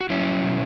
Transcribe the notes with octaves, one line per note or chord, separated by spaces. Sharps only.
F#4
F#3 C#4 E4
B2